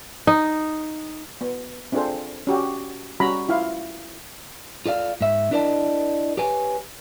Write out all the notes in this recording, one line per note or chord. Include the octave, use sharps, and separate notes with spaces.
D#4
B3
C4 D4 F4 G#4 A4 C5
C#4 F#4 G4
G3 C#4 F#4 A#5 B5
E4 F4 F5
F4 A4 D5 F5
G#2 E5
D4 E4 A#4 D5 D#5 A5
G4 B4 C#5 G#5